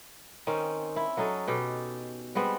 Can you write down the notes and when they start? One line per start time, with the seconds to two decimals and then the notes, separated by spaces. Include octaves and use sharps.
0.47 D#3 C4 C#4 D#4
0.96 E4
1.17 F#3 C#4 D#4 A4
1.48 B2 G4 A4
2.35 G3 G#3 B3 C4